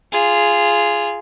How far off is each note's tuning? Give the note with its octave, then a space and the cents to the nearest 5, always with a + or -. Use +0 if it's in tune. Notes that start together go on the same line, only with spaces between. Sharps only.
F4 -10 G#4 +0